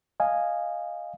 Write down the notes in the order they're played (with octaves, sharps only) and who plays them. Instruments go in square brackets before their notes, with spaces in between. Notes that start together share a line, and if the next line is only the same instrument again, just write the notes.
[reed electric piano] D#5 F5 G#5